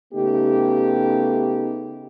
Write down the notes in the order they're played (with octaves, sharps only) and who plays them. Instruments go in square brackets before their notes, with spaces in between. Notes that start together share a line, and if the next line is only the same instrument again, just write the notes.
[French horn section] C#3 A3 B3 D#4 G4